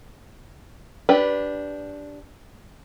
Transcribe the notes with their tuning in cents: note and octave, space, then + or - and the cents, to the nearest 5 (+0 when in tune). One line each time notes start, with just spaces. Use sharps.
D4 -10 G4 +0 B4 +0